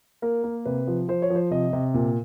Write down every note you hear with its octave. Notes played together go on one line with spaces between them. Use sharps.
A#3 A#4
A#3
C3 B4
F3
F3 C5
C#5
F3 C5
C3 D#5
C3
A#2